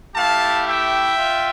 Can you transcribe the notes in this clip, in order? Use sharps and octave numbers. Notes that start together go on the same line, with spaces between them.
A3 E4 G4 F5 A5
E5 G5
F4